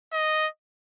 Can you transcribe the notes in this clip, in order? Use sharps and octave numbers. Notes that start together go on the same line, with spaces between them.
D#5